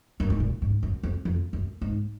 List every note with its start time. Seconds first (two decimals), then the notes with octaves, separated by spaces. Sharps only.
0.20 F#2
0.30 G#2
0.40 A#2
0.62 G#2
0.83 F#2
1.03 F2
1.25 F2
1.53 F#2
1.81 G#2